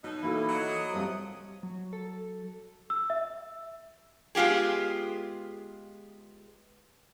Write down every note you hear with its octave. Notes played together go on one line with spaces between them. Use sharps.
B2 F#3 D#4 C#5 A5
E3 A#3 E4 F#4 A4
F#3 D#5
D#6
F#2 C3 F3 G3 C4 D#6
F#3
A4
E6
E5
G#3 B3 F4 G4 G#4